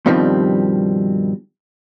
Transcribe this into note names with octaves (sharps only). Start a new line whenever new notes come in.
G2 B2 D#3 F3 G3 C4